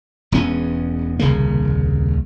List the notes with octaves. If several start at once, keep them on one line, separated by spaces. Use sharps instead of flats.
E1 E2 B3 C#4
D#1 C2 C#3 A#3